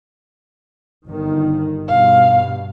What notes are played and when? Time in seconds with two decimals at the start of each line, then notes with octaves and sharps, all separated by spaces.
1.08 G1 D#3
1.88 G2 B2 F5